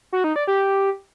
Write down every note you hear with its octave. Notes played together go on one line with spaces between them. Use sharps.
F#4
D#4
D5
G4